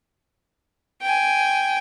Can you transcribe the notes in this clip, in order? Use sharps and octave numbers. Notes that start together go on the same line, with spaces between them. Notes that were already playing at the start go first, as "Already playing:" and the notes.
G5 G#5